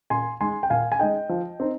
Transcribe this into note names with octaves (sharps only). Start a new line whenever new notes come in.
A#2 G#5 C6
G#3 D#4 G#5 C6
G5
A#2 F5 G#5
G#5
G#3 D#4 D#5 G5
F3
C4 D#4